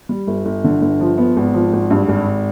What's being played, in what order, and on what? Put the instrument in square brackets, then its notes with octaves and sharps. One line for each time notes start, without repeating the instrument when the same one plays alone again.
[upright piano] G3
G1
G1
D3
G1
F3
B3
G#1
F3
G#1
G2
G#1